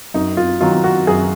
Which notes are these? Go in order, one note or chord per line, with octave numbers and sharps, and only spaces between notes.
F#2 D#4
F4
D#3 F#3 F4
F#4
F#2 G#4